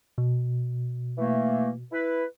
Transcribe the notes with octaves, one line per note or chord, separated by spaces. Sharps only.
B2
E3 A3 A#3
E4 B4